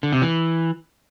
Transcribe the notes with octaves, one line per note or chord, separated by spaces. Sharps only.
D3
C3
E3